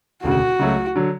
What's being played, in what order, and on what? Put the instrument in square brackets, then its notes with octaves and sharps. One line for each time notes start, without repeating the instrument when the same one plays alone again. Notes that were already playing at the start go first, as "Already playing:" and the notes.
[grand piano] E1 D2 C#3 [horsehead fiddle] F#4
[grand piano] C#2 C#3 F#3 A3
D3 F#3